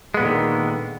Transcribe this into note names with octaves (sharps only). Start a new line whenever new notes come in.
A#2 D3 D#3 G#3 B3